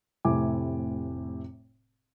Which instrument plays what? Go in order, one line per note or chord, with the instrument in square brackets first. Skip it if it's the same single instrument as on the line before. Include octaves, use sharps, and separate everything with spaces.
[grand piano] F1 A2 C3 E4 G#5 D6